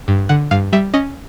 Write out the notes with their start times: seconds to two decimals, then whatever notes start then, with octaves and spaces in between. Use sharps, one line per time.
0.08 G2
0.29 D3 F#5
0.51 G2 F5
0.73 G3 E5
0.94 C#4 D#5